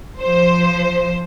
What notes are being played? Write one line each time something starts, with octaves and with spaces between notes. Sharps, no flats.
F3 C5